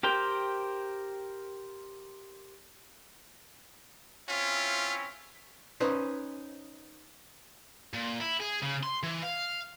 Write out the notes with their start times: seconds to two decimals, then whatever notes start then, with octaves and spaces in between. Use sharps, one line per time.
0.03 G4 A#4 C5 G5
4.29 C4 C#4 E4 F4 B6
5.80 C#4 D#4 B4 C5
7.94 A#2
8.20 E4
8.40 G#4
8.62 C#3
8.83 C6
9.03 E3
9.22 F5